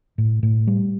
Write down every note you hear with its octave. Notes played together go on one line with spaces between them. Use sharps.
A2
A2
G3